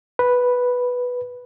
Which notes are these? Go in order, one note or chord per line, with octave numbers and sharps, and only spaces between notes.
B4